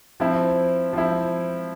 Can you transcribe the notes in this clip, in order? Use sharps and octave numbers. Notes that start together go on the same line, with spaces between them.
F3 C4 E4
F3 C4 E4